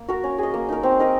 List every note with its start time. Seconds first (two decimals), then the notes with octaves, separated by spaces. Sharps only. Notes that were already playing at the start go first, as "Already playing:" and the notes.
Already playing: A#3
0.08 F#4 A#4
0.24 C#4
0.38 G#4 D#5
0.54 A#3
0.69 D#4 A#4
0.83 C4
0.99 D#4 A#4 D#5